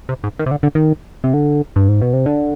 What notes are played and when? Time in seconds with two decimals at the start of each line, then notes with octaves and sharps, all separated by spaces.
0.09 C3
0.24 G#2
0.39 D#3
0.46 C3
0.51 D3
0.63 D3
0.75 D#3
1.24 C3
1.34 D3
1.76 G2
1.88 G#2
2.02 B2
2.13 C3
2.26 D3